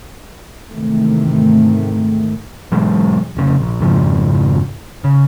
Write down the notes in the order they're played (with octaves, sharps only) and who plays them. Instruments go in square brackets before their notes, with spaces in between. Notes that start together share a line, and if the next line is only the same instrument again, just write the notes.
[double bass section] E2 G#2 C3 D#3 A3
[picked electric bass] B2 E3 F#3 G#3
F1 C#3
A#1
F2 G#2 C#3 F3
C#3